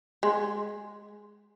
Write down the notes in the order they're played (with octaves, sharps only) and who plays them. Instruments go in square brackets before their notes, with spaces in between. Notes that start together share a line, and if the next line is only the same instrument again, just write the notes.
[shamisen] G#3